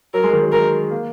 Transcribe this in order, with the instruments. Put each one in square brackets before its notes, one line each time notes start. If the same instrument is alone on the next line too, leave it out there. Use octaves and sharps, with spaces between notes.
[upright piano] F#3 [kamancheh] A#4
[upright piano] G#3
D#3
F#3
[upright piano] G#3 [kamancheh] A#4
[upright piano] A#3